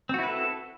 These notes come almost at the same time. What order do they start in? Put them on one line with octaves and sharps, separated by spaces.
C4 F#4 E4 B4 A4